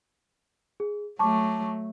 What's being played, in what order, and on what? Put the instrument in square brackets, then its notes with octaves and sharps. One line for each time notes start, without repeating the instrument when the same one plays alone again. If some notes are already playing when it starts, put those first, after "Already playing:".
[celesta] G#4
[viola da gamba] F#3 A3 [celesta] A5 C#6 D6